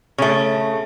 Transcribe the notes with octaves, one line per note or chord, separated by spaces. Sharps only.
C#3 A3